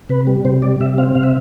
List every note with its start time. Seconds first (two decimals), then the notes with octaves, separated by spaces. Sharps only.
0.09 C3 B4
0.27 G3
0.45 C3 C5
0.62 G3 D5
0.80 C3 E5
0.98 C4 F5
1.15 C3 F5
1.23 E5